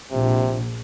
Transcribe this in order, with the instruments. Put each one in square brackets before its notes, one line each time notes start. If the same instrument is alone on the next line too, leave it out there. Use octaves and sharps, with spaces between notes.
[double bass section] A#1 [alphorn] C3